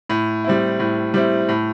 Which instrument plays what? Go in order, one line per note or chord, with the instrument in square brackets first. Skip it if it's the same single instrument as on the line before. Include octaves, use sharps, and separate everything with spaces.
[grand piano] A2
G3 C4 E4
A2
G3 C4 E4
A2